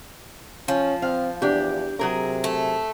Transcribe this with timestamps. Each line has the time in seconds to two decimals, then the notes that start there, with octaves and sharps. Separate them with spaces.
0.68 F3 C#4
1.02 C4 F5
1.42 E2 D4 G4
1.99 C3 F#3 G#4 A#4
2.44 A3